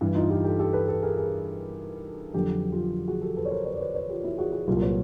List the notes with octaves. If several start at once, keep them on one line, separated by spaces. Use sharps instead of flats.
G2 E3
D#4 F4
F4 G4
G4 A4
G4 A4
A4 B4
A4 B4
G#4 A#4
G#4 A#4
F2 D3 F#3 G4 A4
F4 G4
F#4 G#4
G4 A4
A4 B4
C#5
A#4 C5
B4 C#5
D5
B4 C#5
B4 C#5
F4 G4
E4 F#4
F#4 G#4
F#4 G#4
C2 A#2 F#3 F4 G4
B4 C#5